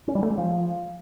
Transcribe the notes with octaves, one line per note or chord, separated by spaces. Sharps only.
C#4
G3
A3
G#3
F3